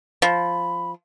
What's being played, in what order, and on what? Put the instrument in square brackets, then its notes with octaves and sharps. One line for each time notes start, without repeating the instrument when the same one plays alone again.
[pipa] F3 [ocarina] B5